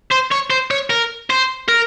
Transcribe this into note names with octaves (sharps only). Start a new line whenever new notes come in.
C5
C#5
C5
C#5
A#4
C5
A#4